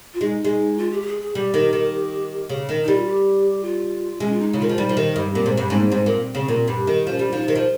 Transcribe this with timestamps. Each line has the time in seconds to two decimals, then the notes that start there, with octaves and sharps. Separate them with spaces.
0.14 F4
0.21 G#3 D#4
0.44 G#3
0.78 F4
0.92 G4
1.02 G4
1.07 G#4
1.21 G#4
1.35 G3 G4
1.54 D#3
1.73 D#3
2.49 C#3
2.69 D#3
2.84 G3 D#4
2.95 F4
3.06 G4
3.63 F4
4.20 G#3 C#4
4.32 F4
4.40 D#4
4.53 C#3
4.59 D#3 F4
4.69 F3
4.78 G3 D#4
4.89 F3
4.97 D#3
5.16 G2
5.29 C#4
5.35 A#2 C4
5.46 G#2
5.57 G2
5.64 C#4
5.70 G#2 C4
5.79 A#3
5.87 G#2 C4
6.06 A#2
6.35 C#3
6.48 A#2
6.68 G2
6.87 D#3
7.06 F3 C#4
7.19 G3
7.30 F3 D#4 F4
7.48 D#3
7.55 F3